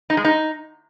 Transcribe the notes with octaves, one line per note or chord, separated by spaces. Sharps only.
D#4
G#3
D#4